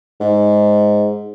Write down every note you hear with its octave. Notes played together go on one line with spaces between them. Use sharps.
G#2